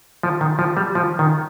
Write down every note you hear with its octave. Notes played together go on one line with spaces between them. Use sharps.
F3
D#3
F3
G3
F3
D#3